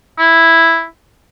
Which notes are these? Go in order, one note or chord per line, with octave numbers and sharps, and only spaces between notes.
E4